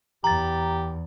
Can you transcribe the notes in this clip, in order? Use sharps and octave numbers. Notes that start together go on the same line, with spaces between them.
E2 G4 A#5 A6